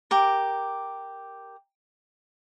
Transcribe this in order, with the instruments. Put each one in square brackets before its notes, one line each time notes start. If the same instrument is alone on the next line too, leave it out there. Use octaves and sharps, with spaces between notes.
[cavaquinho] G4 A#4